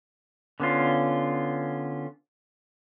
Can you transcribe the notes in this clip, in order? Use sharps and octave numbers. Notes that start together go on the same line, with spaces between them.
D3 B3 C#4 F4